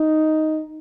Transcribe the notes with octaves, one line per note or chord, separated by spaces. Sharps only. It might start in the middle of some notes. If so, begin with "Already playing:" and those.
Already playing: D#4